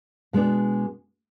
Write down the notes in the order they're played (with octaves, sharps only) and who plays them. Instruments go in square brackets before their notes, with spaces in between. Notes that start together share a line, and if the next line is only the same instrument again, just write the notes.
[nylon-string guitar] B2 G#3 B3 D4